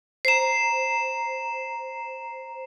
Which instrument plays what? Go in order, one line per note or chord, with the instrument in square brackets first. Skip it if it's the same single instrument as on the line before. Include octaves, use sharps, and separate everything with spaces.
[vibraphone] C5 A#5 [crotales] C7 E7